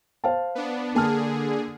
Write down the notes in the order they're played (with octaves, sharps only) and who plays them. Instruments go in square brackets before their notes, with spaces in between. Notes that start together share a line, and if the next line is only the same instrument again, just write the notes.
[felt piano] C5 F5 A5
[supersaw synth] B3 D4
[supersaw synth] D3 G#4 [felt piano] A#3 A5 F6